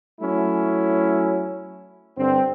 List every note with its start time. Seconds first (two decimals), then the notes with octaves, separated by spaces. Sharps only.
0.21 F#3 A3 C#4 E4
2.18 G2 D3 C4